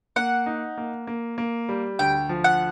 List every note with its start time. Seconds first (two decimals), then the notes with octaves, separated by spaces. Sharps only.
0.16 A#3 F#5
0.46 D#4
0.78 A#3
1.07 A#3
1.38 A#3
1.69 G3
1.99 D2 G5
2.29 F3
2.44 F#5